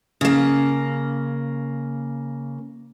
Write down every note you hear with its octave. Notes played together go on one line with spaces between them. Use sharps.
C#3 A#3